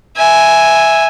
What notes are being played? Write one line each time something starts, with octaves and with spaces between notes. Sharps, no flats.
E5 G#5